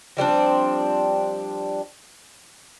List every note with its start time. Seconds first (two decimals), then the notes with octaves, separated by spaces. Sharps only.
0.17 F3 G3 C4 D4